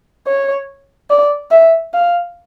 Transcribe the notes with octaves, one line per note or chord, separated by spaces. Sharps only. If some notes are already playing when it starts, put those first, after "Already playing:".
C#5
D5
E5
F5